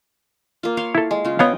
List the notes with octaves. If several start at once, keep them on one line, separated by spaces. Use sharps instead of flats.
A#3 F4
C#5 F5 C6
E4 A4
G#3
C#3 F4
B3 C#5 D#5 F5 G5 C#6